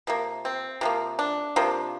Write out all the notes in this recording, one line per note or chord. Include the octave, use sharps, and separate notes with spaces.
C3 F3 A#3
C4
C3 F3 A#3
D4
C3 F3 A#3